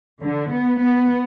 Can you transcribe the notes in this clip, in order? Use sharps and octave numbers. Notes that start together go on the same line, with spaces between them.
D3
B3
B3